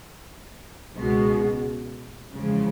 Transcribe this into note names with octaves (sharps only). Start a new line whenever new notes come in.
C#2 B2 G#3
E2 C#3 F3 G#3